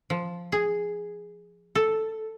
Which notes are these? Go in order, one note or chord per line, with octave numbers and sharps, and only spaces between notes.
F3
G#4
A4